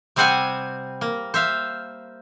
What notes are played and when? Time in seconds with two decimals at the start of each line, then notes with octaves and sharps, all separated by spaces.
0.16 C3 G3 C4 C5 F#5 G#5
1.01 A#3
1.34 C5 E5 F5